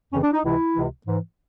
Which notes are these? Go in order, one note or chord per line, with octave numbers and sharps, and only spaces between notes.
F2 C#3 E3 C#4
D4
D#4
C#2 C3 E3 E4
C#2 C3 E3
G#2 E3